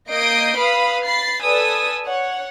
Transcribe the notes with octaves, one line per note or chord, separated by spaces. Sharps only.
A#3 D#5 D#6 G6 C7 D7
B4 F5 B5 D#6
B5 A6 C7
A4 B4 D5 G#5 D#6 E6
C#5 F#5